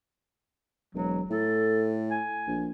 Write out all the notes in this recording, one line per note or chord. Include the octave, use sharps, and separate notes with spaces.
E1 F#3
A2 A4
G#5
A#1